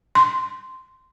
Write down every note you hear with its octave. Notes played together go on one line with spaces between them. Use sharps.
C6